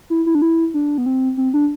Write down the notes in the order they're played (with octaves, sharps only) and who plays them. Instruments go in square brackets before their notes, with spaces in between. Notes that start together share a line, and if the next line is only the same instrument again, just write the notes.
[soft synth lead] E4
E4
D4
E4
D4
B3
C4
C4
D4